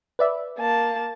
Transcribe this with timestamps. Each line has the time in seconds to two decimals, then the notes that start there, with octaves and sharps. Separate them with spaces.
0.19 B4 D5 E5
0.59 A#3 A5